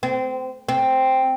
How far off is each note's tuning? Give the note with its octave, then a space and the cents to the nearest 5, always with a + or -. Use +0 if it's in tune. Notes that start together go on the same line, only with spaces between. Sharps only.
C4 -25
C4 +0